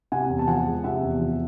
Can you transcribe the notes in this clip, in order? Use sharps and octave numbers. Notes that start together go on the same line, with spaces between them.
C3 F#5 G#5
E2
A5
F3 F#5 G#5
G#3
C3 E5 F#5
E2
F3